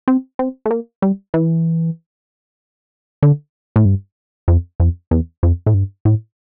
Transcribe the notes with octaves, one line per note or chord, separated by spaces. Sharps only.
C4
C4
A3
A#3
G3
E3
D3
A2
G2
F2
F2
E2
F2
A2
G2
A2